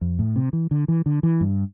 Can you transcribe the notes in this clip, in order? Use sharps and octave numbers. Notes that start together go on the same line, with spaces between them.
F2
A2
C3
E3
D3
E3
D3
E3
G2